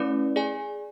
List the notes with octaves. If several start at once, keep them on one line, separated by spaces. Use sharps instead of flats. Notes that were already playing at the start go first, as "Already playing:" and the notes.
Already playing: A3 C#4 E4 B4 D5
G#4 D5 G#5